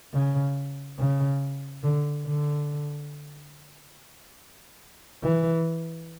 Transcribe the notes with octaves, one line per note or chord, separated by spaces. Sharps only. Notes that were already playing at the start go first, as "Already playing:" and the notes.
C#3
C#3
D3
D3
E3